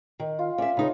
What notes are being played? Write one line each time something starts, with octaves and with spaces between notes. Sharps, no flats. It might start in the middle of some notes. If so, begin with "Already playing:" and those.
D#3
F4
C#4 D5 E5
C#3 D#4 C#5